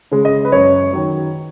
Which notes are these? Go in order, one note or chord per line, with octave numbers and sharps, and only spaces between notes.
C#3 G#3
D#5
B4
F#2 C#5
D#3 F#3